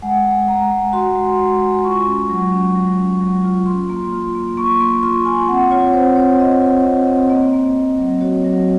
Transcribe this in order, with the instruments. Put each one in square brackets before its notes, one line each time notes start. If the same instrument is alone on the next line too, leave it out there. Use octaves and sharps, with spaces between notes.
[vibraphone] G#3 F#5
G#3
G#3 A#5
G#3
F#4 C6
G#3
G#3
G#3
F4 C#6
C#4
F#3
C#4
F#3
C#4
F#3
F4
F4 C6
A#3
F4
A#3
A#3 C#6
A#3 C6
F4 C6
F4 G#5
C4 F#5
F4 C#5
C4 C5
C4 C#5
C4 D#5
F4
C4
C4
A#3 D#5
A#3
A#3
F#3
F#4 C#5
F#3